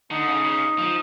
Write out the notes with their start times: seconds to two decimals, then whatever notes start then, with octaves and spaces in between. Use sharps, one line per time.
0.11 D3 D#4
0.28 C#3
0.44 C#3
0.79 F3